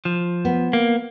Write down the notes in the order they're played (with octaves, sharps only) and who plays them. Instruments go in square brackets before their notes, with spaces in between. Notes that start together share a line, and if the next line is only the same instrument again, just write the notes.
[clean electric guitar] F3
[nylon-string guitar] B3
[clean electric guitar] A#3